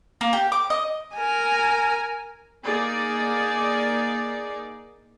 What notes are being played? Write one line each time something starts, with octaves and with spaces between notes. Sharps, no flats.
A#3
G4
D6
D#5
A#4 G#5
A#3 D#4 G#4 D5